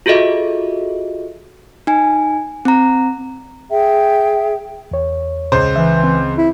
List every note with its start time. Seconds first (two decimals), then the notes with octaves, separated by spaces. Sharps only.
0.06 F4 F#4 G#4 A4 D#5 E5
1.87 D#4 G#5
2.65 C4 A#5
3.70 G#4 E5 G5
4.91 E2 C#5
5.52 C#2 C5
5.76 E3 E5
6.04 C4
6.38 E4